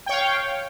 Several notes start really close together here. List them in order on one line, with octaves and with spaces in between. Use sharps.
G5 C#5 F5